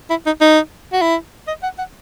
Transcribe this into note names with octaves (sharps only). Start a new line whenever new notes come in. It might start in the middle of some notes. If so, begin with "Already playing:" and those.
E4
D#4
D#4
F#4
E4
D#5
F#5
F#5